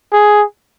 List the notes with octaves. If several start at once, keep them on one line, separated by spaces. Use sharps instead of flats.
G#4